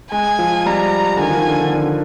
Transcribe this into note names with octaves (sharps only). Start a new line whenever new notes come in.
G#3 G#5
F3
G3 A#5
D3
D#3 G#5
F3
D#3
D3
D3
D3